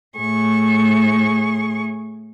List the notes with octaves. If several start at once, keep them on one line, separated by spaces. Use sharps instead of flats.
A2 G#4 C#6